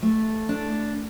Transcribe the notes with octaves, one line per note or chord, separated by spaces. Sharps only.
A3
D4